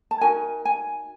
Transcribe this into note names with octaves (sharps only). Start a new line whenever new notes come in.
A5
D#4 F#4 A#4 G#5
G#5